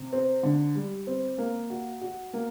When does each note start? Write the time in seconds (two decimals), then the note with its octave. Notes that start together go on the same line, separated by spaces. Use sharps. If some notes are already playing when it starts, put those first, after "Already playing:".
Already playing: C3
0.13 C4
0.43 D3
0.75 G3
1.07 C4
1.38 A#3
1.70 F#4
2.01 F#4
2.33 A#3